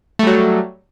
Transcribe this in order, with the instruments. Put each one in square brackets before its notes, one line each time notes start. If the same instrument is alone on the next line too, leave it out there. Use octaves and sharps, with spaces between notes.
[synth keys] A3
G3
F#3